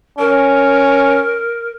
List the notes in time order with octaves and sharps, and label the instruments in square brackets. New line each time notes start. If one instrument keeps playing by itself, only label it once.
[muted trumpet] C#4 [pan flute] A#4